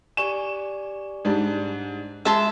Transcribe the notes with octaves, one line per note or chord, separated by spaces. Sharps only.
G4 D5 G#5 C#6 E7
G#2 G3 D4
G#3 E5 A5 C6